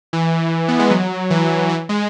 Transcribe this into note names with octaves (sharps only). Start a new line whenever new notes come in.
E3
B3
G#3
F#3
E3
E3
G#3